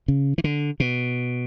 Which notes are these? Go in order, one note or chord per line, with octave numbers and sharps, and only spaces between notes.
C#3
E3
D3
B2